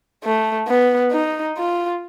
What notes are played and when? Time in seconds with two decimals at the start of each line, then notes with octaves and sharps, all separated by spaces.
0.24 A3
0.68 B3
1.12 D#4
1.57 F4